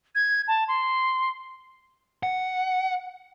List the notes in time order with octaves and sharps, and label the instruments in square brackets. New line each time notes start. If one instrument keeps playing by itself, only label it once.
[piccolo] G#6
A5
C6
[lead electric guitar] F#5